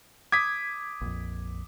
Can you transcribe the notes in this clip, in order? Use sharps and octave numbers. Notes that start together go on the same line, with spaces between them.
D6 D#6 G#6 B6
A#1 F2